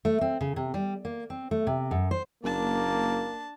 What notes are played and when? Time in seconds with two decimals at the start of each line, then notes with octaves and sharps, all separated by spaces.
0.05 A3
0.21 C4
0.41 C#3
0.56 C3
0.74 G3
1.05 A#3
1.30 C4
1.51 A3
1.67 C3
1.91 F#2
2.11 C5
2.44 F#1 A#3 D4 A5